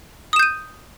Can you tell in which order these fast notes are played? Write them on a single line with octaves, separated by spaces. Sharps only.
D#6 E7 G6 D#7